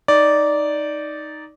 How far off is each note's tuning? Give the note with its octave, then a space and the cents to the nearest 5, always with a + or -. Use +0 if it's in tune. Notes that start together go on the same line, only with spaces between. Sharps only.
D#4 +0 D5 -10